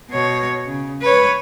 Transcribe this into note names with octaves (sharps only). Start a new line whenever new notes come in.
B2 C#5
C#3
B4 C#5